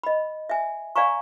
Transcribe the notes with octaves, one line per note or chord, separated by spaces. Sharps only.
D#5 B5
E5 G#5
D5 F5 G#5 A#5 C#6